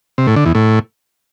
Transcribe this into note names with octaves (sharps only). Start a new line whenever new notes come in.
C3
A2
D3
E2
A2